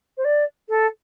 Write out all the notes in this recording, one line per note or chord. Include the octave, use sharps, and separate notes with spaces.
C5
D5
A4